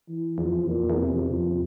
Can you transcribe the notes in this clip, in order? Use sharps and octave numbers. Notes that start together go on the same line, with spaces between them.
E3
E2 F3
F2
E2
F2
E2 A#2
F2
E2
F2 C3
E2
F2
E2
F2 F3
E2